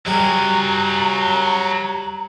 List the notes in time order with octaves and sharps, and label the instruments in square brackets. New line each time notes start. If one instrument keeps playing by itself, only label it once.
[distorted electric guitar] F#3 G#4 [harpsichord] G3 [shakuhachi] A#5